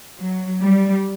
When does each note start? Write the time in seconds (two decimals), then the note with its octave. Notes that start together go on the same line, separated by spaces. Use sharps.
0.19 F#3
0.61 G3